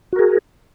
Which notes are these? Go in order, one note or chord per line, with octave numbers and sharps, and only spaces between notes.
F#4 G#4 A#4